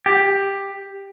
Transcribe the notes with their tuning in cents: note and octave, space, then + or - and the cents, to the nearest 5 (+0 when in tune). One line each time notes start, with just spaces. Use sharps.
G4 +10